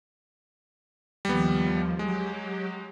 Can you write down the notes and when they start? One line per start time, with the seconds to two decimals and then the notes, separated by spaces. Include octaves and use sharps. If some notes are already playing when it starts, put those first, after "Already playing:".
1.25 D#2 F3 G3 B3
1.99 F#3 G#3 G4